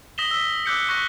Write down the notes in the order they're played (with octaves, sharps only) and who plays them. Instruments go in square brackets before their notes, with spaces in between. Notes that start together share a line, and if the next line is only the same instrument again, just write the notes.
[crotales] D#6 A#6 B6 E7 G7
E6 B6
D6 E6 F#6 G6 B6 C#7
C#6 F#6 A#6 B6